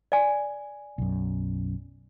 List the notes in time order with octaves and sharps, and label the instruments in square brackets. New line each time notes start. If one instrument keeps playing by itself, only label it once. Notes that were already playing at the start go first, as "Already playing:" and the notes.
[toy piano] D5 G#5
[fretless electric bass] B1 F#2